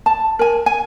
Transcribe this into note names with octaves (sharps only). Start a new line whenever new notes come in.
A5
A#4 G#5
G#5